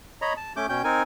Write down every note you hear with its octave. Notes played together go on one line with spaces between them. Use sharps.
C#5 D#5 A#5 B5
A5
A3 C#4 D6 G6
B2 C#4 G5 G6
C4 D#4 A#4 G#5